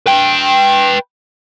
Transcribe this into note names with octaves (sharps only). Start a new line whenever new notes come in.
B4 G5